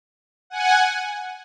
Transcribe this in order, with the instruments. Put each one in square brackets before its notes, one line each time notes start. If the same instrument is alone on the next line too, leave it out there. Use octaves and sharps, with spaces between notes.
[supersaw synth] F#5 G#5